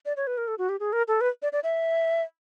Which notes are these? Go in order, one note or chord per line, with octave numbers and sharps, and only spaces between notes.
D5
C#5
B4
A#4
A4
F#4
G4
G#4
A#4
A4
B4
D5
D5
E5